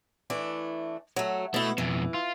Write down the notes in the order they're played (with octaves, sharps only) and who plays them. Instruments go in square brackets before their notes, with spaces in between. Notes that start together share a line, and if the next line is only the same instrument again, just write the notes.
[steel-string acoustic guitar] E3 A3 D4
F#3 A3
[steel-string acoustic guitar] B2 E4 [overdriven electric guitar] A3
[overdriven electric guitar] F2 B2 [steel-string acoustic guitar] E3
[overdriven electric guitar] F4